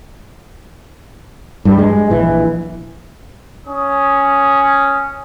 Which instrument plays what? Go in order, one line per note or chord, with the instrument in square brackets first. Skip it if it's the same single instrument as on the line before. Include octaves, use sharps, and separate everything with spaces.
[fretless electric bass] G2 G3
G#3
A#1 E3
[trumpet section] C#4 D#6